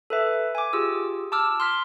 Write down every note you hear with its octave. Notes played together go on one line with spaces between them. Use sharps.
A4 B4 E5
G#5 D6
F4 G4 G#4 E6
A5 D6 E6 F6
C6 F6 B6